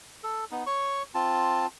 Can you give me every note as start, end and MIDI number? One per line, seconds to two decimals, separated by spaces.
0.23 0.45 69
0.51 0.64 59
0.51 0.64 63
0.67 1.03 73
0.67 1.03 85
1.14 1.66 60
1.14 1.66 65
1.14 1.66 81